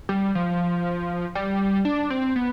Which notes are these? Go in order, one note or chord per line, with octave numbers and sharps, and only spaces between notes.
G3
F3
G3
D4
C4
B3